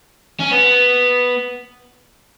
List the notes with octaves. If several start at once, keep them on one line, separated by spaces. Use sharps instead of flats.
C#4
B3